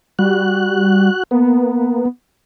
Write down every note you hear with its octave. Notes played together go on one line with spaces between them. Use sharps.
G3 F#4 F#6
A#3 B3